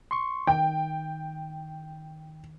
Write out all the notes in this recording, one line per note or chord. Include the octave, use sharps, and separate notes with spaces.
C6 C#6
D#3 G5